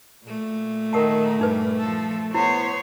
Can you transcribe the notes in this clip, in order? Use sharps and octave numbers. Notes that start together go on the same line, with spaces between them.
A#2 A3
D#3 D#4 A#4 F#5 A5
G2 G3 D4 D#4 B4
F3 A4
B3 E4 C5 C#5